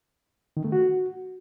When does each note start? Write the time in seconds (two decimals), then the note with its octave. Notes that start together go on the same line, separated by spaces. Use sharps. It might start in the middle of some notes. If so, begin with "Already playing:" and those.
0.57 D#3
0.64 A3
0.72 F#4